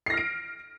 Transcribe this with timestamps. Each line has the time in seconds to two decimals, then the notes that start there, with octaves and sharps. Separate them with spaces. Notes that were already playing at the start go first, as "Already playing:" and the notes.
0.06 C7
0.10 A#6
0.14 F6
0.17 D7